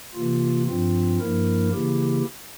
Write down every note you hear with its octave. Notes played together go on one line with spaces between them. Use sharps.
C3 E3 A#3 F4
G2 F3 C4 F4
G2 F3 A#3 E4 A#4
C#3 E3 A#3 E4 G4